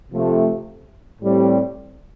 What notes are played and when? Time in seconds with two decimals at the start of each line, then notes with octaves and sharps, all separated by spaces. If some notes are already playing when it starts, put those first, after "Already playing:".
0.11 C3 F3 A3
1.21 A2 G3 C4